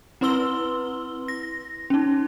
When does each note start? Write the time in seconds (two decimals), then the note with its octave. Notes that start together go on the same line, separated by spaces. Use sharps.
0.21 C4 E4 B4 C6 E6 G7
1.28 A#6
1.90 C#4 D#4